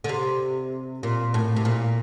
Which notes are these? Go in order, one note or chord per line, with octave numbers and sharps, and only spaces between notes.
D3
C3
A#2
A2
C3
A#2